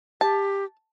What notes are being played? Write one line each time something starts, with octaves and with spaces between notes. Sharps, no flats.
G4 A5